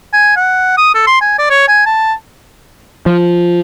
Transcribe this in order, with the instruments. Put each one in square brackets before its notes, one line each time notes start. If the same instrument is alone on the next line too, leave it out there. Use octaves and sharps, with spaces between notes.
[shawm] G#5
F#5
D#6
A4
C6
G#5
D5
C#5
G#5
A5
[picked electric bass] F3